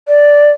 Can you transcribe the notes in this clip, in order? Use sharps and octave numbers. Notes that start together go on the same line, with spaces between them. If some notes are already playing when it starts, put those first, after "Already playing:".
D5